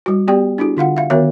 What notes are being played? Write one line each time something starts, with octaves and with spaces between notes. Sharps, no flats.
G3 F#4
B3 G4 D5 G5
D4 E4 F#4 G#4
D3 F4 F5 F#5
E5 F5
D#3 B3 F#4 A#4 C#5 E5